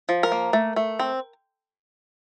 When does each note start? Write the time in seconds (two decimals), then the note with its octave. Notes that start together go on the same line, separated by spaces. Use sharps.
0.09 F3
0.23 A#4
0.32 A#3
0.53 A3
0.76 A3
0.99 C4